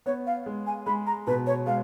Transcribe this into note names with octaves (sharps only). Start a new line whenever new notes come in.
B3 C#5
F5
G#3
G#5
G#3 B5
A#5
B2 B4
C#5
G#3 F5